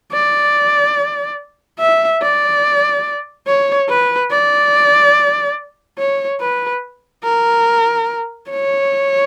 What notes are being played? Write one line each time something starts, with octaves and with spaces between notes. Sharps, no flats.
D5
E5
D5
C#5
B4
D5
C#5
B4
A#4
C#5